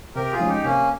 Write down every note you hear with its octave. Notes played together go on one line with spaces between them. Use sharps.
C3 G4 A#4
F4 G#4
F3 G#3 C#4
D#4 G4
C3 A#3 C#4